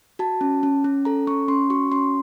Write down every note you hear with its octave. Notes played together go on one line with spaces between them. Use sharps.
F#4 A5
C#4
C#4
C#4
A4 A#5
C#4 C#6
C#4 C6
F#4 C#6
C#4 C6